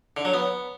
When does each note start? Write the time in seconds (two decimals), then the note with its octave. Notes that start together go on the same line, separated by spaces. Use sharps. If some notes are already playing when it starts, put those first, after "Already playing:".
0.17 D3
0.25 F#3
0.34 B3